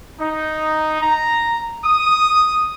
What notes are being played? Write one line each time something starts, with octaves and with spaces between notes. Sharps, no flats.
D#4
A#5
D#6